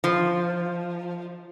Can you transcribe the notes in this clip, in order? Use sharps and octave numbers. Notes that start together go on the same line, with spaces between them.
F3